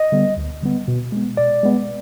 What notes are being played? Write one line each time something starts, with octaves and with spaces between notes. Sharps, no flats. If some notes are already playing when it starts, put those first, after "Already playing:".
Already playing: D#5
D3 G3 B3
D2
D3 G3 B3
B2
G#3 B3
B2 D5
G#3 B3